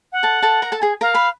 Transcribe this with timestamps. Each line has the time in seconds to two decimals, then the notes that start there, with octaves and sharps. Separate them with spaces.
0.12 F#5
0.23 A4 A5
0.42 A4 A5
0.62 A#4 A#5
0.72 A4 A5
0.81 G#4 G#5
1.01 A#4 F5 A#5
1.14 B4 B5